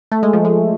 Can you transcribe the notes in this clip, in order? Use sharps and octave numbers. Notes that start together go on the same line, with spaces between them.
A3
G#3
F3
G#3